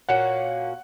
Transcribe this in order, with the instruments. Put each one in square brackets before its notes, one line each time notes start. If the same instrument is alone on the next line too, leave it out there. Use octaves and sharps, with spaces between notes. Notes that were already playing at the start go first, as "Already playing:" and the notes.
[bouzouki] A#2 A#3 C#4 F#4 [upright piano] F#5